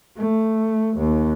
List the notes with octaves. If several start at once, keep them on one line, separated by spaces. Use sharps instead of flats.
A3
D#2